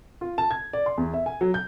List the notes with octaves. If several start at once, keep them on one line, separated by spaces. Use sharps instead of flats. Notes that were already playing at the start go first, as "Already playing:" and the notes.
F4
A5
G#6
D5
C6
E2
E5
G#5
F#3
G6